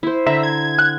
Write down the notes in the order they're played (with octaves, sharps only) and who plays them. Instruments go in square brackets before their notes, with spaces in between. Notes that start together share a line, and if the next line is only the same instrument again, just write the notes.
[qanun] E4 C5
[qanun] D3 [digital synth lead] E5 [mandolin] A#5
[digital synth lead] G#6
[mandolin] F#6